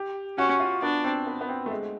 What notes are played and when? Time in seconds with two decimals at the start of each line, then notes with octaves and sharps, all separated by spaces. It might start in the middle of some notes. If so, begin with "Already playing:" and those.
Already playing: G4
0.38 C#4 F#4
0.60 F4
0.82 B3 D4
1.04 C4
1.27 B3
1.41 B3
1.49 C4
1.66 A3
1.71 G#3